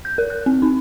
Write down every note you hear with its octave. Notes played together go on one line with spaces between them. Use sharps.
G6
A#4
F#6
C4
D#4